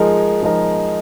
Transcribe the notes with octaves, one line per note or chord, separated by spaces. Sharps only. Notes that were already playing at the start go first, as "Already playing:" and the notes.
Already playing: F3 G#3 D#4 A#4
F3 G#3 D#4 A#4